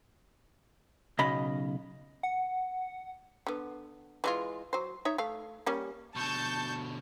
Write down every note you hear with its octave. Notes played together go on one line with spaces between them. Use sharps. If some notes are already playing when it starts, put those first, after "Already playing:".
B1 C#3 D#5 B5
F#5
D3 B3
E3 G#3 F4
F#3 C5
D#4 C#5 E5
A3 F5
G3 A#3 C#4
B2 D3 A5 C#6 G6